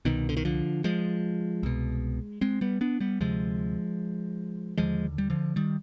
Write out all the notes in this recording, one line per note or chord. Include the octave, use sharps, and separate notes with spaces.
C2 B2 D#3
D3
D#3
D3 F3
F3 G#3
C2 B2
G#3 C4
G3 B3
B3 D4
G3 B3
D2 C3 F3 G#3
D#2 D3 F3 G#3
G3
D3 F3
D#3 G3